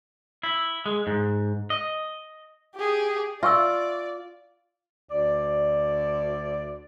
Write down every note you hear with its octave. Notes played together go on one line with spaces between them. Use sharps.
E4
G#3
G#2
D#5
G4 G#4
F4 D5 E5 C#6 E6
D2 D5